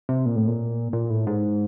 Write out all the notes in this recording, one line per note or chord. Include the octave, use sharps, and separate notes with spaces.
C3
A#2
A2
A#2
A#2
A2
G#2